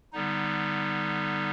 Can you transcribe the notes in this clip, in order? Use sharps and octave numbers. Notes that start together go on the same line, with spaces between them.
D3 G3 B3 D#4